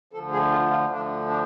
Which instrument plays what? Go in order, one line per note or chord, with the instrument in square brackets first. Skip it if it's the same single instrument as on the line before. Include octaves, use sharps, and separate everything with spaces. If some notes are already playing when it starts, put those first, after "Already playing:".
[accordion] D2 D3 F3 A4
G#4
F4
F4
D2 D3 F3 D4
D4